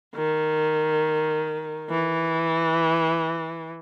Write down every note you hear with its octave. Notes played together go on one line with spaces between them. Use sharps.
D#3
E3